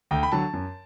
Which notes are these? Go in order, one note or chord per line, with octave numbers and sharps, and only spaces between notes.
D2 G5
B5
D3 F#3 A5
F#2